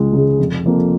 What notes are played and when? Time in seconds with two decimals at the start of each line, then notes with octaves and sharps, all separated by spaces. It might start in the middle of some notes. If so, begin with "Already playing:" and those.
Already playing: C#2 C#3 G#3
0.13 C#3 G#3
0.39 F1
0.65 F2 F3 A#3 F4